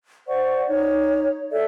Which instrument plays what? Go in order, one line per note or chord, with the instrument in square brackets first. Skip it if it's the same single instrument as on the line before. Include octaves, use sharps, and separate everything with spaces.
[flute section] C5 D5 F#5 C#6
D#4 C#5
A4 D5 E5